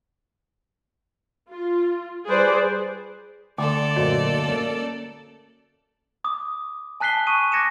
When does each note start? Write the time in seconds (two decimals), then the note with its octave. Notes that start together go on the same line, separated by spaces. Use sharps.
1.50 F4
2.28 G3 G#4 B4 C5 D5
3.58 D2 A4 D5 G5 D6
3.96 F#2 A#2 F#4 C5 C#5 D#5
4.46 A3 A#3 C#4
6.24 D6 D#6
7.00 G#5 A5 F#6 B6 C7 G7
7.27 G#5 C#6 D#6 D#7
7.52 D6 F#6 G#6 A#6 C#7 E7